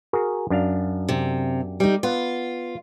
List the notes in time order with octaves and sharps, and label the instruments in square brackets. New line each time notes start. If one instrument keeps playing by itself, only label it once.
[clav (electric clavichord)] F#4 G#4 A#4
F#2 D4 F5
[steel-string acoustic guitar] C3
G3 D#4
[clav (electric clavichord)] B3 [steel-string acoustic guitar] F4